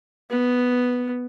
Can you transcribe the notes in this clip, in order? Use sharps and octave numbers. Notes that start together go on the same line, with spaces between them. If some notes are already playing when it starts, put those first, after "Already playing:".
B3